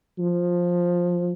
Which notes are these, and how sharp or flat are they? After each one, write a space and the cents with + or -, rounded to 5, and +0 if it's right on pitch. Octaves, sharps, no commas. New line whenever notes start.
F3 +10